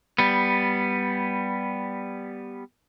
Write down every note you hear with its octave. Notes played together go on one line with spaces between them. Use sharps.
G3 B3